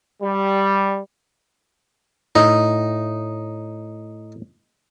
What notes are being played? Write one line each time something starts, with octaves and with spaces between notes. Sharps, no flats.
G3
A2 D#4